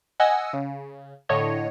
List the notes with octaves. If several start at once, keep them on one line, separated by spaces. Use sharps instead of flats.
D#5 F#5 G#5 E6
C#3
A2 D3 C#5 D#5